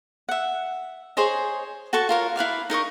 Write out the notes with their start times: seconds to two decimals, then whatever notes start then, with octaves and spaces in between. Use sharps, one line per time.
0.29 E5 F#5
1.17 G#4 C5 C#5 D#5
1.93 F#4 A4 A5 C#6
2.09 F4 A#4 C#5
2.36 E4 B4 F5 D6
2.70 D#4 A#4 D#5 C#6